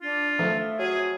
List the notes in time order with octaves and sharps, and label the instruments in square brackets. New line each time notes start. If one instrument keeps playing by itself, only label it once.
[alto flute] D4 [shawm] F4
[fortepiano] F3 A3 [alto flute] E5
[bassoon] F#3 [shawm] G#4